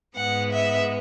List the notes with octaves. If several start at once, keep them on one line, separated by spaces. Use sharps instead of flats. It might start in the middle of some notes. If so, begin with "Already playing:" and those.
G#2 G#3 B3 F#5
E5